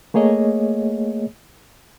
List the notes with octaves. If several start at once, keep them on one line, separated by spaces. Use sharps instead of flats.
A3 A#3 G#4 C#5 D#5